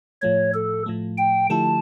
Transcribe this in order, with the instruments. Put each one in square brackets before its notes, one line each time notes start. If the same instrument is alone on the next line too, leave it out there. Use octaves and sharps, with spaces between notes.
[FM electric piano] A2 F3 A3 [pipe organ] C#5
[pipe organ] A4
[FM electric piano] A2 F3 A3
[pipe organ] G5
[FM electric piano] D3 F3 A3 E4 G4 [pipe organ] A5